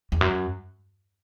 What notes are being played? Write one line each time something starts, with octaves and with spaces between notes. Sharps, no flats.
E2
F#2